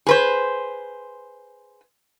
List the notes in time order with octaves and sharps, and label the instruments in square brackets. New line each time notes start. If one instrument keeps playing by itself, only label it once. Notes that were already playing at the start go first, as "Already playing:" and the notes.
[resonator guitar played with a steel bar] G#4 B4 C5